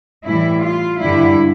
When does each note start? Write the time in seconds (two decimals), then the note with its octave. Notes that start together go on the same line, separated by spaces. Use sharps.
0.24 A2 E3 G3 E4
0.62 F4
1.01 G2 D3 G3 E4